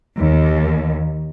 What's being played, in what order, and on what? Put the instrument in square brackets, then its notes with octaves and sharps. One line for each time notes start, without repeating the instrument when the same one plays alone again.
[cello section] D#2